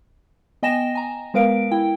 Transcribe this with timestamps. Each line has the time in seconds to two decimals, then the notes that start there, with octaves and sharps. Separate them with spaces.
0.63 B3 D#5 G5 G#5 A#6 E7
0.95 G#5 A#5
1.34 G#3 B3 A#4 B4 F5 D7
1.71 E4 G5